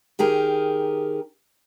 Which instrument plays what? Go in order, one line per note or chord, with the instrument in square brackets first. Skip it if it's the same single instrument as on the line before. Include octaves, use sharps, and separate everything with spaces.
[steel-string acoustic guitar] D#3 G4 G#4 A#4